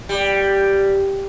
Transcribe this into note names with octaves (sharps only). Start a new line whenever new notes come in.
G3